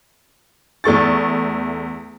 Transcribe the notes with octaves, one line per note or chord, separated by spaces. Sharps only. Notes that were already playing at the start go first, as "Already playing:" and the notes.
E2 A3 C#6 A6